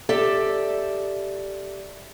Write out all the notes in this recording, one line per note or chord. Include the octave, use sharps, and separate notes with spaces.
G4 A4 D5 E5